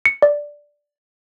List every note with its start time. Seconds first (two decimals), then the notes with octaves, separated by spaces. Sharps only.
0.06 C#7
0.22 D5